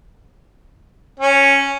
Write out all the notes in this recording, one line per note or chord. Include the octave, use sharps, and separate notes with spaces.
C#4